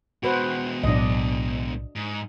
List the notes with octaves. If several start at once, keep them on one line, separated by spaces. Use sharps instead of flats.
B2 G#3 F#4 B4 C5
B1 A2 F#3 D4 D#5
G#2